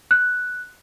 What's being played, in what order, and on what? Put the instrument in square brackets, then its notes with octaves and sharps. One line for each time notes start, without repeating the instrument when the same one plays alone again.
[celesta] F#6